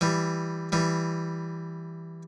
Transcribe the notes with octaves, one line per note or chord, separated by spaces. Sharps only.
E3 G3
E3 G3